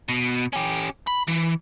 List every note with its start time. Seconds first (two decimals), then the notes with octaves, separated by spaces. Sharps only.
0.09 B2
0.53 C#4 G4
1.07 B5
1.28 E3